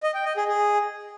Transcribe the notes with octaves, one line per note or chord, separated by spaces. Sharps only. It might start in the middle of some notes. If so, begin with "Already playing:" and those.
D#5
G5
D#5
G#4
G#4